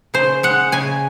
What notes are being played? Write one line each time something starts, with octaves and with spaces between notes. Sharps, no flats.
C#3 C5
G#3 F#5
C#3 G#5